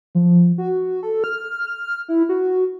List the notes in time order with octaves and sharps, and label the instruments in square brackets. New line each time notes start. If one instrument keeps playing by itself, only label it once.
[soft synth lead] F3
F#4
A4
F6
F6
E4
F#4